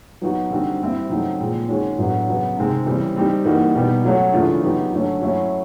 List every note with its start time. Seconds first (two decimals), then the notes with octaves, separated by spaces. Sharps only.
0.22 F#3 B3 D#4 F#4
0.51 D3 G3 C4 D#4 F#4
0.81 G3 C4 E4
1.10 C#3 F#3 A3 C4 D#4
1.40 A#2 F3 G#3 C4
1.69 D#3 G#3 C#4 F#4
1.98 A2 F#3 B3 D4 F#4
2.28 C#3 F#3 B3
2.57 C3 D#3 G#3 C4
2.86 C#3 E3 G3 C4
3.16 G3 C4 D#4 G4
3.44 E3 G3 A#3 D#4 F#4
3.75 B2 G3 B3 D#4 G4
4.04 F#3 A3 C#4 F#4
4.33 C#3 E3 A3 D4 F4
4.63 F#3 B3 D#4 G4
4.92 D3 F#3 A3 C#4
5.22 F#3 A3 C#4 E4